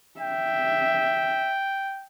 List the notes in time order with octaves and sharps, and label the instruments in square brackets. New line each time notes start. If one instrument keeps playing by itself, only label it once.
[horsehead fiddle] E5 [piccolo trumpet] G5